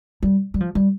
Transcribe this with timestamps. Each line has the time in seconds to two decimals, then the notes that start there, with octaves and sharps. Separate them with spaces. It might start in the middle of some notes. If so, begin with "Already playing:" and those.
0.23 G3
0.54 G3
0.60 F3
0.75 G3